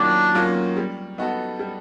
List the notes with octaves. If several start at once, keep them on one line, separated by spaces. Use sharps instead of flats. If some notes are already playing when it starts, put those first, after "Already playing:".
Already playing: D#3 F#3 A#3 C#4 D4 F4
F#3 A#3 C#4 F4
G3
B3 D#4 F#4 A4
G3